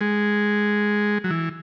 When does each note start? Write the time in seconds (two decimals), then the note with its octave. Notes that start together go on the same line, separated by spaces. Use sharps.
0.01 G#3
1.24 F#3
1.30 E3